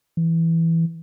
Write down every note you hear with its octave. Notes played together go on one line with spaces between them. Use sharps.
E3